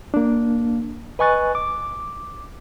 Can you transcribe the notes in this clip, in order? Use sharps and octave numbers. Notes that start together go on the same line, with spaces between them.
A#3 D4
B4 D#5 G#5 C#6 F#6 A6
D6